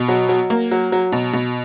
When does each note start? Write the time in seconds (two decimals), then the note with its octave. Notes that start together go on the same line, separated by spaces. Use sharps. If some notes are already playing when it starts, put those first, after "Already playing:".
Already playing: B2
0.08 F#3
0.29 F#3
0.50 A#3
0.71 F#3
0.92 F#3
1.12 B2
1.33 B2